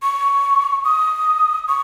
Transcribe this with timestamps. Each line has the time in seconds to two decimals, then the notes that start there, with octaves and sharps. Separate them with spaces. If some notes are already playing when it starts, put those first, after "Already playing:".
0.02 C#6
0.85 D#6
1.68 C#6